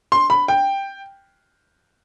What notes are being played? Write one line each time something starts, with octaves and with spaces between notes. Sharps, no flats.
C6
B5
G5